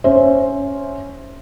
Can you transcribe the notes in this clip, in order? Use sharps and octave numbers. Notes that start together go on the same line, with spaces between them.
C#4 C5 E5